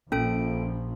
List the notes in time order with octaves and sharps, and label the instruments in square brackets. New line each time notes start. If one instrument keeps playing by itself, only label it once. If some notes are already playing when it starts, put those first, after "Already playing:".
[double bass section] A#1 F3 [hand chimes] A#3 A4 D7 [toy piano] C#4